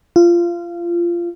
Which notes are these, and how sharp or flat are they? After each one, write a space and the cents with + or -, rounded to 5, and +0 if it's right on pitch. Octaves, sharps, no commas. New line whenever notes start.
F4 -20